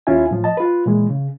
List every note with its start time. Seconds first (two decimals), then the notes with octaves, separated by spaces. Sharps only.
0.07 D#2 C#4 E4 F4 E5 G#5
0.31 A2 F3
0.44 D#5 A5
0.57 F4 B4
0.86 A#2 E3 G#3
1.10 C#3